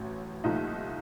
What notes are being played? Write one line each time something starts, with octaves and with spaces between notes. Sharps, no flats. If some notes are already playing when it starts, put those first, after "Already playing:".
Already playing: A1 A2 F#3
C2 A#2 F3 A3 D#4